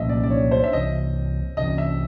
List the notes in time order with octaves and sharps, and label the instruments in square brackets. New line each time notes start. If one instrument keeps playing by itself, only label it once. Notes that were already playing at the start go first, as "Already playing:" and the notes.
Already playing: [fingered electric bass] C2 A#2 F3 A#3 [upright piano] D#5 E5
[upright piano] D5
D5
C#5
C5
E5
[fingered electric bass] C2 C3 E3 [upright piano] D#5
[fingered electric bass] C2 C3 E3 [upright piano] D#5
[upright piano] E5